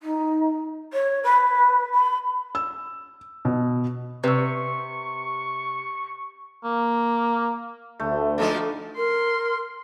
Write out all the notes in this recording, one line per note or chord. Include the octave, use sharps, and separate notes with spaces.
D#4
C#5
B4
B5
E6
B2
C3 B4 C#6 E6
A#3
D2 A3
B2 F3 G#3 D4 D#4 A4
A#4 C6